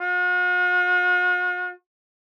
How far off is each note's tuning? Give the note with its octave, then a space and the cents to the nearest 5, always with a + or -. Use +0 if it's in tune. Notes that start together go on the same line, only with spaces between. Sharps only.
F#4 -45